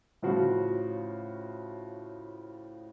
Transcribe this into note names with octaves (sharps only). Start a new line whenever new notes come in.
A2 C#3 F3 F#4